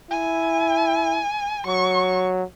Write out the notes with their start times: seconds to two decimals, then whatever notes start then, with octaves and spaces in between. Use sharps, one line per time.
0.11 E4 G#5
1.67 F#3 C#6